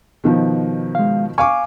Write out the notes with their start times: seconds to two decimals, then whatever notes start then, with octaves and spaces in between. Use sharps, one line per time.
0.24 B2 D#3 F3
0.95 G#3 F5
1.38 F5 G#5 C#6 D6